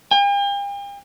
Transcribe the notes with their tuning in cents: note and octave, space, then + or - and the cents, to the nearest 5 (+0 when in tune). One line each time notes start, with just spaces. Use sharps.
G5 +45